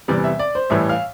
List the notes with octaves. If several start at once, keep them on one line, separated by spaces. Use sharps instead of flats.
E2 C3 E3 G3 D5
E5
D5
C5
A2 E3 G3 E5
F5